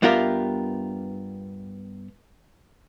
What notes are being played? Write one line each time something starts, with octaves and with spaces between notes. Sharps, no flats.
G2 B3 F4 G4 A#4 E5